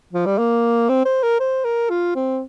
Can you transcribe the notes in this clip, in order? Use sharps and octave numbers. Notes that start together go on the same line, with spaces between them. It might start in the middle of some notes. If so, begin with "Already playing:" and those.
F3
G3
A#3
C4
C5
A#4
C5
A#4
F4
C4